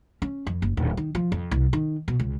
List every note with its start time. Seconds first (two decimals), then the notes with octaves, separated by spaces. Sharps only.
0.22 C#4
0.47 F2
0.62 F#1
0.77 D#1
0.97 D#3
1.15 F3
1.32 F2
1.51 C2
1.73 D#3
2.08 B2
2.20 C#2